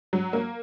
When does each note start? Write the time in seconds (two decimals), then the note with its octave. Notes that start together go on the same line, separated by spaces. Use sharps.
0.13 F#3
0.33 A#3